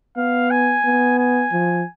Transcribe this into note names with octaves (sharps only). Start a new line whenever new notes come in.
B3 F5
G#5
B3
G#5
F3